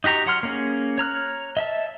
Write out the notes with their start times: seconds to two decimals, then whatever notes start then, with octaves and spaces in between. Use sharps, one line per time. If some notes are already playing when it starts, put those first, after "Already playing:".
0.04 D#4 F#4 G4 A#5 C#6
0.26 F#3 F#5 C6 F6
0.43 A#3 C#4 G#4
0.98 C#5 A#5 F6 F#6
1.57 D#5 E5 A5